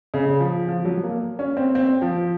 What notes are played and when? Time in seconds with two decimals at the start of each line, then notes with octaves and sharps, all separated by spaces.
0.14 C#3
0.40 F3
0.68 F3
0.85 F#3
1.03 A#3
1.39 C#4
1.57 C4
1.75 C4
2.02 F3